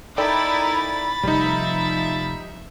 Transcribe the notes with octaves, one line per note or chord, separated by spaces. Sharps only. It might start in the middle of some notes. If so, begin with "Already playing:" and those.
D#4 E4 A4 A#4 D5 G5 B5 A6
F1 F3 G3 D#4 E5